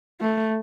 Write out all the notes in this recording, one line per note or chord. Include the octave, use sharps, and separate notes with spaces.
A3